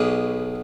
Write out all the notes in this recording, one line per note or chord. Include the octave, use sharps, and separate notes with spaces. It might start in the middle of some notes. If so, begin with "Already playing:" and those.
Already playing: B1 B2 G#4